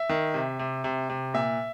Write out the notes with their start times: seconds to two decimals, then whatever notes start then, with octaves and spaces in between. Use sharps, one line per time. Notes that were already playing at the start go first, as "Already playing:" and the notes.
Already playing: E5
0.09 D#3
0.34 C3
0.59 C3
0.84 C3
1.10 C3
1.34 A#2 E5